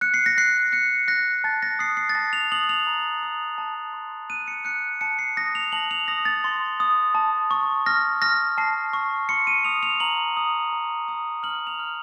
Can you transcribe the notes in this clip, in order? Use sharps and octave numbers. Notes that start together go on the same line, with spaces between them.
F#6 C#7
C7
A#6
F#6 C7
F#6 C#7
F#6 A#6
A5 A6
A#6
D#6 C7
C7
A6
A5 A#6
F7
D#6 F#7
F7
A#5
D#6
A5
C6
F#6 D#7
C#7
F#6 C#7
A5 C#7
C7
D#6 A#6
F7
A5 F#7
F7
D#6 A#6
A6
C6
D#6
A5
C#6
F6 A#6
F6 A#6
A5 C7
C#6
C6 C#7
D#7
D#6 F7
F7
A#5 F#7
D#6
A#5
D#6
F6 F#7
F7
F6